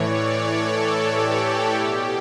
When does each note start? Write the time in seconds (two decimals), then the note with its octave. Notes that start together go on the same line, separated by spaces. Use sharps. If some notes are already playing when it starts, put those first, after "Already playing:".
Already playing: A2 E3 C#5 D5
0.16 C#5
0.48 A4
1.11 G4
1.75 B2